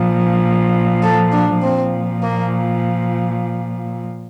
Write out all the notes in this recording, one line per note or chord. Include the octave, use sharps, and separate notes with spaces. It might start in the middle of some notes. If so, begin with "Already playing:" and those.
Already playing: A#2 F3
A4
D4
A#2 F3 C4
A#3